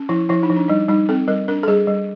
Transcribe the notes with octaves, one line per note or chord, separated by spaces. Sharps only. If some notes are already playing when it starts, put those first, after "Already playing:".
Already playing: C#4
F3 E4
F3 E4
D#4
F3
D4
G3 D#4
G3 D#4
C4 A4
G3 A#4
D4 A#4
A4
G3 G#4
G3